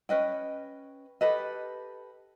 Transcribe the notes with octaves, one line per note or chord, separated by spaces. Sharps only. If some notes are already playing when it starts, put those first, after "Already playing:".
C#4 B4 D#5 G5
G4 A4 B4 D#5